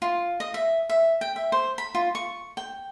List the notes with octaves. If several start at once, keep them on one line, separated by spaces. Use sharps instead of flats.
F4
D#5
E5
E5
G5
E5
C5
B5
F4
C#6
G5